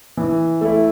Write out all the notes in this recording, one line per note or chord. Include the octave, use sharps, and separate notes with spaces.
E3
A3 E4